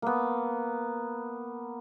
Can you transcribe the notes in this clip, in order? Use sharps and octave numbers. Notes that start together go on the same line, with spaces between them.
A#3 B3